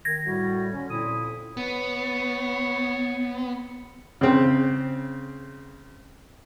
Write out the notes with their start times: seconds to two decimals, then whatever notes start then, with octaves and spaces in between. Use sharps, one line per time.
0.05 D#3 G#6 A#6
0.25 A2 G3 F#4
0.73 D3 C#4
0.91 F2 A#2 E4 D#6
1.57 B3 C#5
4.21 C#3 C4